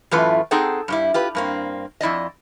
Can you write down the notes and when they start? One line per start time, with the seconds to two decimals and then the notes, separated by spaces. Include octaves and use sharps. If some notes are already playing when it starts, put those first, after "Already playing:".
0.11 F#2 A2 E3 A3 F4 B4
0.51 C4 D#4 G#4 A4 F#5 G5
0.88 G2 G3 E4
1.14 F4 G4 B4
1.35 G2 A#3 C4
2.01 F2 E4 D5 D#5